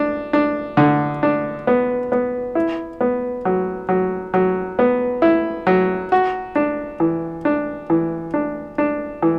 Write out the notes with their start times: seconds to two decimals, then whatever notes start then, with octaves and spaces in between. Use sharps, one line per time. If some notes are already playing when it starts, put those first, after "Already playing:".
Already playing: D4
0.33 D4
0.77 D3
1.23 D4
1.67 B3
2.12 B3
2.55 E4
3.01 B3
3.45 F#3
3.89 F#3
4.34 F#3
4.79 B3
5.22 E4
5.67 F#3
6.12 F#4
6.56 D4
7.00 E3
7.45 D4
7.90 E3
8.34 D4
8.78 D4
9.22 E3